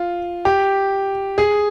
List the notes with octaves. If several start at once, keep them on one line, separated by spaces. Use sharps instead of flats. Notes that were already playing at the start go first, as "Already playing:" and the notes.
Already playing: F4
G4
G#4